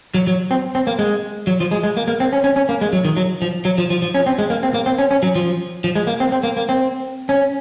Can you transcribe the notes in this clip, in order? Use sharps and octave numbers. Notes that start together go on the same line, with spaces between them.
F#3
F#3
C4
C4
A#3
G#3
F#3
F3
G#3
G#3
A#3
A#3
C4
C#4
C#4
C#4
A#3
G#3
F#3
D#3
F#3
F3
F#3
F3
F3
F3
C#4
C4
G#3
A#3
C4
A#3
C4
C#4
C#4
F#3
F3
F3
G#3
A#3
C4
C4
A#3
A#3
C4
C#4